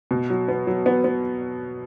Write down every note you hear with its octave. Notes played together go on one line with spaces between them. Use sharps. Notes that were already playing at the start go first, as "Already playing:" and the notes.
B2
F#3
B3
F#3
B3
B3